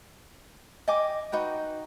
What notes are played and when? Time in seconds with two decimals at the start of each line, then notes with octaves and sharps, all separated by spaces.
0.88 D#5 G5 G#5 D6
1.32 D#4 F#4 B4 G5